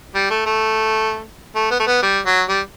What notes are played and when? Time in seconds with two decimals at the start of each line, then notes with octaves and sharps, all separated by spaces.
0.15 G3
0.31 A3
0.46 A3
1.56 A3
1.71 B3
1.80 A3
1.87 B3
2.03 G3
2.26 F#3
2.49 G3